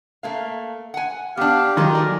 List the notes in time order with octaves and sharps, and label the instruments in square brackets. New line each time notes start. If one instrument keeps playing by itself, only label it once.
[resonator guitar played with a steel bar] A3 A#3 F5
F#5 G#5
[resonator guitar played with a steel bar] B3 D4 [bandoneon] G4 [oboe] F5
[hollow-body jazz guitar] D#3 F#3 [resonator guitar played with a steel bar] A#3 F4 A4 [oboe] A#4
[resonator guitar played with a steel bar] D5 G#5